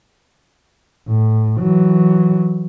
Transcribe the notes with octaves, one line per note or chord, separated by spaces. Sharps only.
A2
E3 F#3